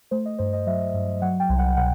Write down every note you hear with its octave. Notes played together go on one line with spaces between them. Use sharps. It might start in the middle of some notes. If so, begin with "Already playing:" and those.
A3 C5
D#5
G2 C5
D#5
F#3 E5
G2
F#3 F#5
G5
C2
F#5
B2 F#5